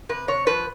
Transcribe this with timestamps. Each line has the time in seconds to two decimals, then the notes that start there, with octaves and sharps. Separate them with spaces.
0.09 C3 B4
0.28 C3 C#5
0.46 F3 B4